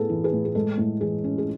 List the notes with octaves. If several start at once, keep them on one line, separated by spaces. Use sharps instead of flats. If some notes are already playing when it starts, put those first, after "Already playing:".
Already playing: A2 B3 G#4 A4 B4
E3
G#4 B4
A2
G#4
G#3 A4
A2
E3 G#4
C#4
G#4